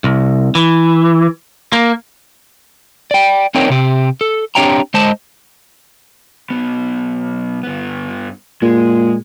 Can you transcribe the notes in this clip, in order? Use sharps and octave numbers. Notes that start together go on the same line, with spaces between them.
C2
E3
A#3
D5 G5
C4 D4 D#4 A#4 C#5 G5
C3 G4
A4
C4 D4 G4 C#5 G5 A#5
G#3 C5 D#5 A5
B1 B3
G2 B3
A#2 G#3